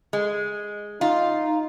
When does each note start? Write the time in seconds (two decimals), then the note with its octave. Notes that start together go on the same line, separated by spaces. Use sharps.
0.13 G#3
1.01 D#4 F4